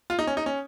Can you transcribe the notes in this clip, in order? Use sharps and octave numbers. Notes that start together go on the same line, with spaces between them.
F4
D#4
C#4
D#4
C#4